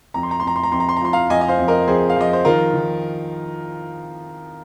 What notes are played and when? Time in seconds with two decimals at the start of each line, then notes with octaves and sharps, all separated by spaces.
0.14 F2 A#5
0.23 C6
0.31 A#5
0.40 C6
0.43 F2 A#5
0.56 C6
0.63 A#5
0.72 F2 C6
0.80 A#5
0.89 C6
0.97 A#5
1.01 F3 C6
1.13 F5 A#5
1.30 F2 D#5 G#5
1.41 D#5
1.48 C5 F5
1.58 F2
1.68 A#4 D#5
1.88 F2 G#4 C5
2.10 F5
2.16 F3 D#5
2.33 C5
2.45 D#3 F4 A#4
2.74 D#3